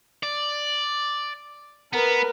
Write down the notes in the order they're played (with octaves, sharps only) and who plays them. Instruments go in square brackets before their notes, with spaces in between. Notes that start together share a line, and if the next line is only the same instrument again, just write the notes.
[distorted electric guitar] D5
[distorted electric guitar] B3 [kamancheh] A#4 B4